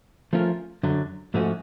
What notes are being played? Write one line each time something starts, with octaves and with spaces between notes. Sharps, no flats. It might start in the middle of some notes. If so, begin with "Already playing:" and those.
F3 A3 C#4 F4 A#4
F#2 D3 F#3
G#2 F3 A3 C#4 F#4